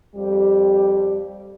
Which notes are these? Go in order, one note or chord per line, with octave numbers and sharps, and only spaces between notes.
F2 G3 G4